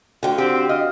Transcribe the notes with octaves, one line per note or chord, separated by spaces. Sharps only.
D3 F4 F#4 G5
C4 G4
D#5 F5